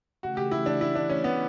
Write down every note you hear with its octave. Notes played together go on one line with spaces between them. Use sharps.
C#3 E3 A3 F#4
G4
E4
D4
E4
D4
C#4
B3